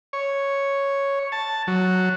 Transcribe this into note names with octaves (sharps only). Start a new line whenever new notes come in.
C#5
A5
F#3